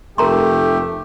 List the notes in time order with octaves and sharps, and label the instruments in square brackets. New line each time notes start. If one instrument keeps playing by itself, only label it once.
[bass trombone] F1 [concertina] A3 [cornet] G4 [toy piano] A#4 A#5 C6